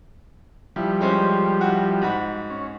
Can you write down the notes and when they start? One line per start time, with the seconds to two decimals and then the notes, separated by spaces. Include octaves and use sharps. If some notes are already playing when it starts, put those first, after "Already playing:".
0.76 F3 G3 E4
1.01 G#3 C#4 C5
1.61 E4 F#4
2.01 G#2 F#4 B5
2.50 C#4